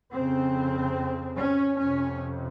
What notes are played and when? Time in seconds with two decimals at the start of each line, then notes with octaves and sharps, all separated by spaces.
0.13 F2 C#3 C4
1.37 C#4
1.79 F2 C3 C#4